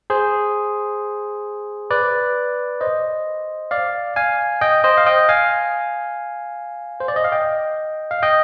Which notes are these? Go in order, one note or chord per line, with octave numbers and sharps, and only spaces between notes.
G#4 C5
B4 D5
C5 D#5
D5 F5
F5 G#5
D#5 G5
C5 D#5
F5
D#5 G5
F5 G#5
C5
D5
D#5
F5
D#5 G5
F5
D#5 G5